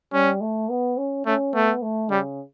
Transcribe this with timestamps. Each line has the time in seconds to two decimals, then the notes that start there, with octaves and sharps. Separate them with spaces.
0.13 G3 C#4
0.41 A3
0.69 B3
0.98 C#4
1.26 A3 C#4
1.54 A3 B3
1.82 A3
2.11 C#3 G3